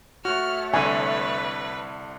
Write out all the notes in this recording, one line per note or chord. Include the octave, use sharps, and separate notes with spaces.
A3 F#4 C#5 F6
C2 D3 B4 G#5